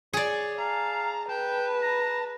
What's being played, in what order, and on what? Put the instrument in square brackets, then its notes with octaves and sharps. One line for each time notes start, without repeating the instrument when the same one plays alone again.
[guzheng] G#4 D5 [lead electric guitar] C#5
[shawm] F5 [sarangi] A5 [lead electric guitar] A#5
[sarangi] B4 [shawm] G5 [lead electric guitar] A5
[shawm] A#5